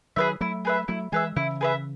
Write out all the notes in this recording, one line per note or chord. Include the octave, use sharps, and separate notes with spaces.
D#3 F#3 G#4 B4 E5
F#3 A3 E4
G#4 B4 E5
F#3 A3 E4
E3 G#3 G#4 B4 E5
C#3 E3 E4
G#4 B4 E5